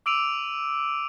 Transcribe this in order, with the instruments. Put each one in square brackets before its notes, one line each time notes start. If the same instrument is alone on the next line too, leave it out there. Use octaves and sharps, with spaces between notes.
[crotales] D6 E6 D7 D#7 F7